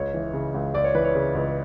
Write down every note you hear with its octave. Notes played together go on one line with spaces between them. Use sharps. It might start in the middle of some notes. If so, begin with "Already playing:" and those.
Already playing: C#2 C#5
E3
C#3
C#2
C#2 D5
C#5
E3 B4
C#5
C#3 B4
C#2